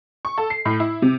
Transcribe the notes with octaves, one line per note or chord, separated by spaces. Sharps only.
C#6
A4
C7
A2
E4
C3